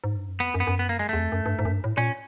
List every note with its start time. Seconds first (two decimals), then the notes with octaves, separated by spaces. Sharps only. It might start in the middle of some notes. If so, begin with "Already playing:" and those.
0.04 G#2
0.16 G2
0.28 F#2
0.40 F2 B3
0.54 F#2
0.60 B3
0.67 F#2
0.79 B3
0.89 A#3
0.99 G#3
1.09 E2 A3
1.19 F2
1.32 F#2
1.46 G2
1.59 G#2
1.65 F#2
1.71 G2
1.84 A2
1.97 A#2 C#4